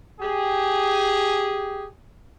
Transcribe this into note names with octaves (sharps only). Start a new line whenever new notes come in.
G4 G#4